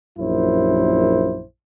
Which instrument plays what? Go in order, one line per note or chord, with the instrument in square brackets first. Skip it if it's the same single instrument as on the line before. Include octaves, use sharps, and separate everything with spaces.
[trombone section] A#1 F#2 E4 C5